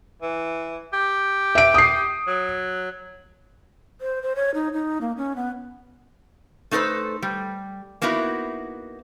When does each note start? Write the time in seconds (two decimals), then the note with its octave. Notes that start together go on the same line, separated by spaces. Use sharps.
0.22 E3
0.93 G4
1.55 E5 D7
1.74 D#6 C7
2.27 F#3
4.01 C5
4.22 C5
4.36 C#5
4.54 D#4
4.73 D#4
5.01 A#3
5.17 C#4
5.36 B3
6.71 A3 D#4 A4 B4 C5
7.22 G3
8.02 A#3 B3 D#4 E4 F#4